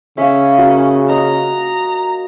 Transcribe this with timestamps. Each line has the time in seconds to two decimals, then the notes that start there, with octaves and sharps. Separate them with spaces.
0.18 C#3 C#4 E5 F5
0.58 A#3 F#4
1.09 D#5 A#5